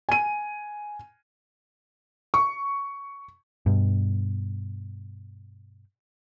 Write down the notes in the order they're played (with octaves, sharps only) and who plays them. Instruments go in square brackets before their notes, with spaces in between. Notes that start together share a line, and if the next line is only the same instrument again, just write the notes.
[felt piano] G#5 D#7
C#6
[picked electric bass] G2 B2